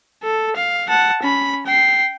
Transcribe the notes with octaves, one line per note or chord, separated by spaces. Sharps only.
A4
F5
F#5 A5
C#4 B5
G5 C7